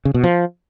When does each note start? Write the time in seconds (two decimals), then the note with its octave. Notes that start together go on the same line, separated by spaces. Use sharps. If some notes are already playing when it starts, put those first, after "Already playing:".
0.05 C#3
0.14 B2
0.24 F3